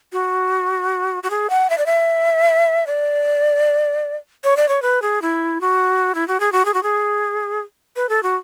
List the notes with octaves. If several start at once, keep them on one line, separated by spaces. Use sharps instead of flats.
F#4
F#4
G#4
F#5
E5
D5
E5
D5
C#5
D5
C#5
B4
G#4
E4
F#4
E4
F#4
G#4
F#4
G#4
F#4
G#4
B4
A4
F#4